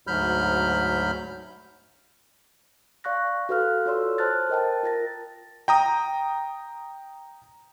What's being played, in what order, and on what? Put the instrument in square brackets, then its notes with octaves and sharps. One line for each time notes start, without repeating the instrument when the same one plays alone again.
[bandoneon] D2 G#2 F#3 B5 F6 G6
[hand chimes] D5 F5 C#6 F#6 A#6
F#4 A4 B4 F5 F6 F#6
F4 A4 C#5 D5 C6 E6
C5 A5 F6 F#6 A6
A#4 D#5 G5 A5
F4 A#4 A6 A#6
[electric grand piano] G5 A#5 D#6